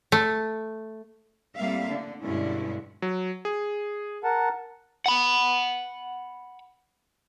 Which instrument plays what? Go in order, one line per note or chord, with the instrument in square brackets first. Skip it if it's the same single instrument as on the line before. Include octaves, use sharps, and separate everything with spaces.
[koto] A3
[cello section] A2 G3 A#3 C4 E5 F5
D3
G2 B2 D3 G#3 C#4 E4
[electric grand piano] F#3
G#4
[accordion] A#4 F#5 A5
[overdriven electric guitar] F#5 B5